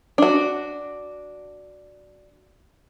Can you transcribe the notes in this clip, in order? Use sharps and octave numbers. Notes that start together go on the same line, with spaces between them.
D4 F#4